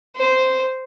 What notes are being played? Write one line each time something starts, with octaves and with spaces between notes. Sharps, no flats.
C5